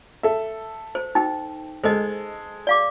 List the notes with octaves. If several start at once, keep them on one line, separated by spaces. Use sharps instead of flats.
A4 E5
C5
D#4 G5
G#3 A4 C5 D#5
D5 F5 D6